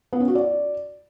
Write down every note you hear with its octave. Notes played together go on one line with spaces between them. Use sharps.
B3
C#4
F#4
D5